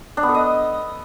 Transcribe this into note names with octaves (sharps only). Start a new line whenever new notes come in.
D4
B3
A4
D#5